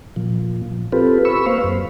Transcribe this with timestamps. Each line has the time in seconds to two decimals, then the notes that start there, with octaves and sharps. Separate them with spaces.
0.16 A#2 F3
0.92 C4 F4 G4 A4 B4
1.25 B5 C#6 E6
1.46 A#3 B4 C5 F5
1.64 F#2